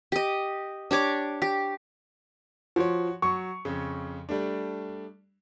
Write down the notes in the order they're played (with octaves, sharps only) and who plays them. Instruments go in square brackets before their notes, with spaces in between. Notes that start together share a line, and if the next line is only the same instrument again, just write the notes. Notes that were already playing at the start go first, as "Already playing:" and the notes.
[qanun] G4 D#5
D4 G4 C#5 D6
G4
[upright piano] F3 [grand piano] F#4 C#5
[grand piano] F#3 [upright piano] C#6
[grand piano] F2 C#3
G3 A3 D4